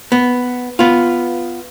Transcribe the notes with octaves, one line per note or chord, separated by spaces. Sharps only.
B3
B3 F4